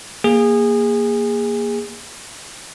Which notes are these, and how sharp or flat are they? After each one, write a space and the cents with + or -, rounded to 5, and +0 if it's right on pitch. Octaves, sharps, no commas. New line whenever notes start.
A#3 +0 G#4 -20